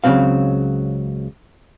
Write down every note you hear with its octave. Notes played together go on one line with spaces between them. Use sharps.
C#2 C#3 F3 F#3 C4 F5